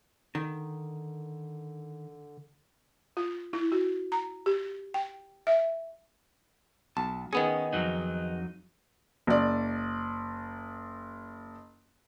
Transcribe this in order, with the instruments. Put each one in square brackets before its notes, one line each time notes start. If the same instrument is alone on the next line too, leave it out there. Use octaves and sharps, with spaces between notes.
[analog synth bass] D3 [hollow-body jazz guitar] D#3
[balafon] F4
E4
F#4
A#5
G4
G5
E5
[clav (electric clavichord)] B1 [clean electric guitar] A5
[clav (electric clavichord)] D#3 B3 G#4 [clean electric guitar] C#4
[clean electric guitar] F2 F#3 D#4
[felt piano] F#1 D5